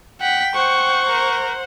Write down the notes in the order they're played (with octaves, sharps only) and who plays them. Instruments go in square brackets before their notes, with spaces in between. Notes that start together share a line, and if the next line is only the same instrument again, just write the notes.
[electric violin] F#5 B6 [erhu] G5
[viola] C5 F#5 [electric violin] C#6
[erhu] A#4